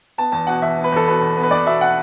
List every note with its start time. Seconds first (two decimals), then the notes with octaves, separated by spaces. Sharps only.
0.18 B3 A5
0.32 E2 A5
0.47 B2 F#5
0.62 E2 E5
0.77 B3
0.84 B4
0.92 E2 A4
1.07 B2 B4
1.21 E2
1.37 B3
1.43 B4
1.51 E2 D5
1.66 B2 E5
1.81 F#5